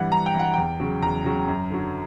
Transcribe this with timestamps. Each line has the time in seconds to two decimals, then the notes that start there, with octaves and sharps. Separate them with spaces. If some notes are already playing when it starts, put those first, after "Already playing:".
Already playing: G2 E3 G3 F#5
0.11 G2 A#5
0.26 G5
0.34 E3 G3 F#5
0.54 E2 G5
0.80 C#3 F#3
1.02 E2 A#5
1.24 C#3 F#3
1.48 F#2
1.70 D3 F#3